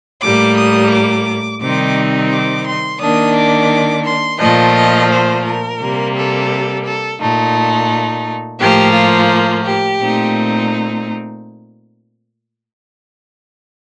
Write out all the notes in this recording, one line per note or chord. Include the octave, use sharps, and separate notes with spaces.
A2 G3 A#3 D6
D#6
D6
C3 D#3 G3 C4 D#4 D6
D6
C6
D#3 A#3 D4 D#6
D6
C6
A#2 F3 A3 D#5
D#5
C5
A#4
C3 G3 A#3
A4
A4
A#2 A3 D#4
A2 F3 A#3 G4
F4
G4
A#2 A3 C4 D#4